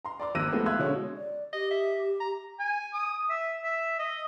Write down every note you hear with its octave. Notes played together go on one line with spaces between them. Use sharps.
A#5 C6
D5 A#5 C6 D6
G#1 A#3 E6 F#6 A#6 D#7
F3 G#3 A3 B3 C4
E5 F5 C6 E6 F#6 G#6
B2 D3 G#3 C#4
D5
G4 D#5
E5
A#5
G#5
D#6
E5
E5
D#5